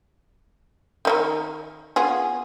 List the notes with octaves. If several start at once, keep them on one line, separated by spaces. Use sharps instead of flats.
D#3 D#4 A#4
B3 F4 G#4